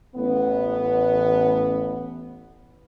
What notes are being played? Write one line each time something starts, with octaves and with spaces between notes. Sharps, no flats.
A1 B3